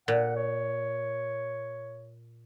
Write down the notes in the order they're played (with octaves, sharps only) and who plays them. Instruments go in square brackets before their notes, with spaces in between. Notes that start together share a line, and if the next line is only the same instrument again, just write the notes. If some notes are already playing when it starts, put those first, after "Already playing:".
[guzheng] A#2 [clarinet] F#5
[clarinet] C#5